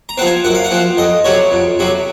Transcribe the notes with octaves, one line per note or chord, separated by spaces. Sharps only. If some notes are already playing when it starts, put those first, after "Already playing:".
A#5
F3 C4 F#5 G#5
F#2 F#5
F5
F#5
F3 C4
F2 D#5
C3 F#3 C#4 C#5
F2
C3 F#3 C#4